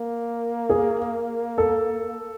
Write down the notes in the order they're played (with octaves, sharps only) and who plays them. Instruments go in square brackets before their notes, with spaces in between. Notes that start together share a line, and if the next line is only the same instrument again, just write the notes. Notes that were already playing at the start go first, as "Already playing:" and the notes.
Already playing: [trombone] A#3
[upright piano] G#4
A4